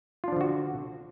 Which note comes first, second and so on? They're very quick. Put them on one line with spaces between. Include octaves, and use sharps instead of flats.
F4 D4 F3 D3 F#4